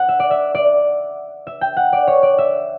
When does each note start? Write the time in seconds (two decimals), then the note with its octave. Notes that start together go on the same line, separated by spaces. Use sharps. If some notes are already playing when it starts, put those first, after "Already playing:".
Already playing: F#5
0.09 E5
0.20 D5
0.31 E5
0.55 D5
1.47 E5
1.61 G5
1.77 F#5
1.93 D5
2.07 C#5
2.23 D5
2.38 E5